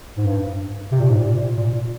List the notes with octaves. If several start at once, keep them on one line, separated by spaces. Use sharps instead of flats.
G#2
G2
C3
A#2
G#2
A#2
A#2